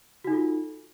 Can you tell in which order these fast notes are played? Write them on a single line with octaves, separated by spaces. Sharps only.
F#4 D#4 A4 F4